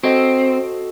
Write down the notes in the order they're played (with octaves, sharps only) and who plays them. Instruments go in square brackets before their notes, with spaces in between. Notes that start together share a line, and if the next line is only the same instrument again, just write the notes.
[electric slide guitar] C4 [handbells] F#4 A4 D#5